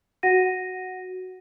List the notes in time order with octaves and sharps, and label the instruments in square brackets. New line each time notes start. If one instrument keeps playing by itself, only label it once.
[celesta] F#4 F#5 A#6 D#7